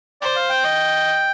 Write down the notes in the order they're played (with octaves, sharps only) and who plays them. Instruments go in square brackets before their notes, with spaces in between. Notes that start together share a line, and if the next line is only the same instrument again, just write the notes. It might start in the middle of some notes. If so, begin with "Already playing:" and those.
[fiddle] C5 [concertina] D5
[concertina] F5
G5
[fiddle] D#5